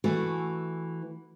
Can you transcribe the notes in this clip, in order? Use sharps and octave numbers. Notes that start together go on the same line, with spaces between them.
E3 A3 F#4